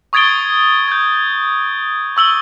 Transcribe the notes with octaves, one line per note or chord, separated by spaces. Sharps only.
C#6 D#6 G#6 A6 D7 G7
G6 G#6
C#6 E6 F#7 G7